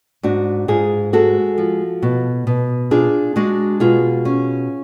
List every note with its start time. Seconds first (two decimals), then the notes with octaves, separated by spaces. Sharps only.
0.23 G#2 D4 F#4
0.68 G#2 F4 G#4
1.13 G#3 F#4 A4
1.58 F3
2.02 B2
2.47 B2
2.91 D4 F4 G#4
3.36 G#3 D4 F#4
3.80 B2 F4 G#4
4.25 C#4